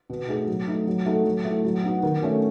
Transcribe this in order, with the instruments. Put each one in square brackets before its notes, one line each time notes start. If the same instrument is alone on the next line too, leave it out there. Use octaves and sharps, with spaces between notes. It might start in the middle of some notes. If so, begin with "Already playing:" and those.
[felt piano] B2
A3 D#4 G#4
F#3
A3 D#4
F#3
A3 D#4 F#4 A4
F#3
A3 E4
F#3
B3 D#4 F#4
D#3
A3 C#4 F#4